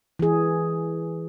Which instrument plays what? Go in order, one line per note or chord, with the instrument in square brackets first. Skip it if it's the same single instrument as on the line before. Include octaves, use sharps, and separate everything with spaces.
[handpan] E3 G#4